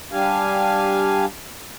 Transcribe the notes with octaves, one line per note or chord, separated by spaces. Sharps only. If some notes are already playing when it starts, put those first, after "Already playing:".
G3 D4 G4 F5 G#5